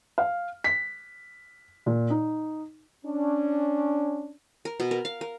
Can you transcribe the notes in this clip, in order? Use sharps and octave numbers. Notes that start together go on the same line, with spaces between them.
F5
B6
A#2
D#4
C#4 D4
A#4
B2
A#4
F5
A#4